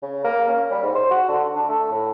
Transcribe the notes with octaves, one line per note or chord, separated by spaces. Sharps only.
C#3
A#3
C#4
G3
G#2
C5
F#4
D3
D4
A3
A2